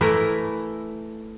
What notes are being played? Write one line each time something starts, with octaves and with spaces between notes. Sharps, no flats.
E3 A3 E4 A#4